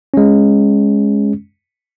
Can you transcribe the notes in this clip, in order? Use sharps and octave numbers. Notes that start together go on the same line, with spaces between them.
G#3 C#4